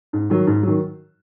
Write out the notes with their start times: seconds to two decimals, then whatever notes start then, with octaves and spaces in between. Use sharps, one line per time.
0.13 G#2
0.30 D#3 F#3
0.47 G#2
0.63 D#3 F#3